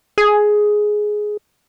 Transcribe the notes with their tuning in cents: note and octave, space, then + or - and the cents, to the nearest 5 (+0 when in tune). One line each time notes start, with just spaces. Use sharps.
G#4 +10